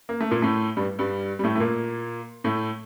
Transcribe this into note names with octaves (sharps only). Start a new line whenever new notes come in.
A#3
A3
A#2 A#3
A2 A3
G2 G3
G2 G3
G3
A2 A3
A3
A#2 A#3
A2 A3